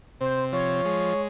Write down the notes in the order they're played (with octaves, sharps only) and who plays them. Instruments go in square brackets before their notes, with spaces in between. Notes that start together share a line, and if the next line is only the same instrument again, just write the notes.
[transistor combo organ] C3 [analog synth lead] C5
[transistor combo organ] F3 [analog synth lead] C#5
[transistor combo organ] G#3